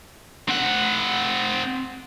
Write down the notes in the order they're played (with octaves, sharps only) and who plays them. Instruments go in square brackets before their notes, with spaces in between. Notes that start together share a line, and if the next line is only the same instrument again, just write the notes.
[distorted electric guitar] C4 F#5